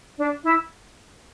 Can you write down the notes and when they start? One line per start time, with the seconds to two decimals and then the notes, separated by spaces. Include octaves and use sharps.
0.17 D4
0.43 E4